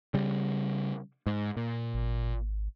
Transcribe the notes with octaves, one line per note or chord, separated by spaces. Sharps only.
C#3 G3
G#2
A#2
G#1